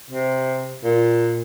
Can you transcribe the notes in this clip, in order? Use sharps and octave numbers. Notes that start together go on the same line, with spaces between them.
C3
A#2